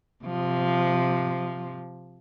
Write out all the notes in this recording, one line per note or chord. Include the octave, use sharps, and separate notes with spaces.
C3 F3